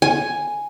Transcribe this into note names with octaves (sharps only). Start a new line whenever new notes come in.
G#5